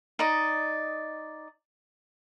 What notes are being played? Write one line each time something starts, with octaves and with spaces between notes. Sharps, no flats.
D#4 D5 D#5